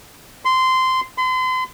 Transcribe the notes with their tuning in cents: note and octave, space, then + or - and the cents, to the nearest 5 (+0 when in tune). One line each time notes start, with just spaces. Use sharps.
C6 -15
C6 -40